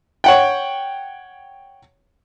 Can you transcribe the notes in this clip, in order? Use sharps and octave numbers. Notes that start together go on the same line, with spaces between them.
C#5 F#5 G5